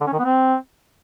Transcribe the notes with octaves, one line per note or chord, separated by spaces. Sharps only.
D3
C#4
D#3
B3
C4